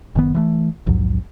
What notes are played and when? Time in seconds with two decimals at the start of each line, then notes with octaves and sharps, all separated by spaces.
0.16 F#1 D#3 B3
0.34 E3 F#3 A3
0.87 A#1 D#2 G#2 F#3